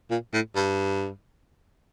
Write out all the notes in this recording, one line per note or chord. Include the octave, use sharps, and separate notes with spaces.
A#2
A2
G2